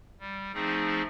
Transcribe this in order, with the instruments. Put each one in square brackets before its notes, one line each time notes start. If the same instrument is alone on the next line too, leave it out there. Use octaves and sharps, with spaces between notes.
[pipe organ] G3
F3 A3 C4 D#4 G#4